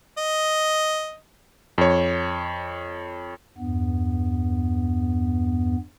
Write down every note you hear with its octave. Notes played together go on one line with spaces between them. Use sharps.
D#5
F2 C#5
E2 G2 B3